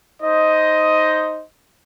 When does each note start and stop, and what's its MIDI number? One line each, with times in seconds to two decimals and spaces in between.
0.22 1.42 63
0.22 1.42 72
0.22 1.42 75